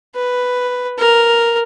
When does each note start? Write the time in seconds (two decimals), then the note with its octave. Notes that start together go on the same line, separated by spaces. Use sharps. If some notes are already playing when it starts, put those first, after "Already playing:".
0.15 B4
0.98 A#4